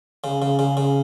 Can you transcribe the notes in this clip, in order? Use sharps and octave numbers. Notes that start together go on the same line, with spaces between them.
C#3
C#3
C#3
C#3